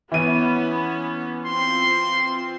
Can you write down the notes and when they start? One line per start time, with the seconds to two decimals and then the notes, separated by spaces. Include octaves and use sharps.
0.12 E3 B3 C#4 D#7
1.45 C4 F4 C6